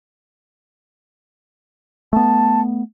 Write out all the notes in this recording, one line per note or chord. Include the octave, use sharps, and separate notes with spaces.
A3 B3 A5